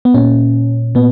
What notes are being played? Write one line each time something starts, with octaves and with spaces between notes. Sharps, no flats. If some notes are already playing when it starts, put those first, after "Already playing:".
B3
A#2 C#4
A#2 B3